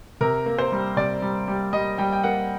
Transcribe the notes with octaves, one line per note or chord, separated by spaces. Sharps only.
C3 A#4
A#3
C5
G3
C3 D5
G3
G3
G3 D#5
G3 G5
G5
A#3 F#5